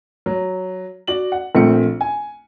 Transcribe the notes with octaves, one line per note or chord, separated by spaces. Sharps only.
F#3
F#4 D5 F#7
F#5
A#1 A3 C4 C#7
G#5